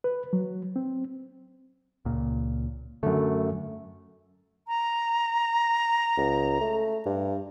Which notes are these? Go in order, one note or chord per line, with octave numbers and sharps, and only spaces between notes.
B4
F#3
C4
C#2 A#2
F#2 D3 A3
A#5
C#2
A3
G2